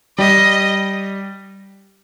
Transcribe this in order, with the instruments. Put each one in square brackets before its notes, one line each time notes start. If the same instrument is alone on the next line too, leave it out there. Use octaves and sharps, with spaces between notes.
[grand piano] G3 [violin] D#5